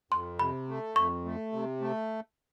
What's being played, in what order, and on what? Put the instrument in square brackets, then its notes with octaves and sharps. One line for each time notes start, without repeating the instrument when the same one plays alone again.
[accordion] F2 [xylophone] C6
[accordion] C3 [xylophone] B5
[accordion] A3
[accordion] F2 [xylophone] C#6
[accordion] A3
C3
A3